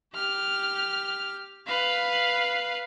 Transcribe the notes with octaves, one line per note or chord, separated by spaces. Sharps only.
G4 F6
B4 F5